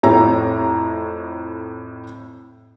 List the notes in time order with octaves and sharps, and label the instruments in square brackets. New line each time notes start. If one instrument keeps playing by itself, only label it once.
[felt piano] F2 A2 C#5 A#5